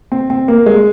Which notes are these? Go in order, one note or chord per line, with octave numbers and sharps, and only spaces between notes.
C4
C4
A#3
G#3